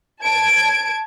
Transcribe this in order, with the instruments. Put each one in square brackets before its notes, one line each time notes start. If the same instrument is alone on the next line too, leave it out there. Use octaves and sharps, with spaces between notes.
[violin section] A5 G#6 D7